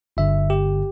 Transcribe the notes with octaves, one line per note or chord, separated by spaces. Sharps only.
G1 G2 D3 E5
G4